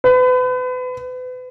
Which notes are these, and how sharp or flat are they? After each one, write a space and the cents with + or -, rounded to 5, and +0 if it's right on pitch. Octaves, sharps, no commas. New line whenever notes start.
B4 +35